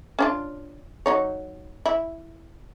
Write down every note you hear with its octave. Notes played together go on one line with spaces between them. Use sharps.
C#4 D4 F4
F#3 D#4 C#5
E4